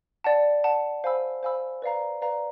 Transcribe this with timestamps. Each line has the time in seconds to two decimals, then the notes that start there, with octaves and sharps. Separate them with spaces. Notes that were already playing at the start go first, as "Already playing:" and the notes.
0.24 D5 F#5 A5
0.64 D5 F#5 A5
1.04 C5 F5 G#5 B5 E6
1.43 C5 F5 G#5 B5 E6
1.82 B4 D5 F5 A#5
2.22 B4 D5 F5 A#5